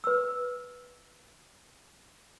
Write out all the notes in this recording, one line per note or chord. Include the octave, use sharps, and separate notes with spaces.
B4 E6